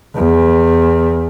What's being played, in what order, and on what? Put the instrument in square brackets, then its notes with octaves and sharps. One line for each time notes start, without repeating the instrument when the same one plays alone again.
[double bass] E2